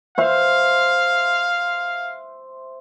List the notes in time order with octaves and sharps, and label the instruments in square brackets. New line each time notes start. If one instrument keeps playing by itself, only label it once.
[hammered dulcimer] C5 E5 [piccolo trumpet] F5